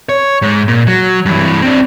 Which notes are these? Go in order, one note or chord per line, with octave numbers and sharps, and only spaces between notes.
C#5
G#2
A#2
F#3
G2 E3
C4 D4